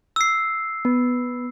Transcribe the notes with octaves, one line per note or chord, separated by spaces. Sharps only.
E6 C7
B3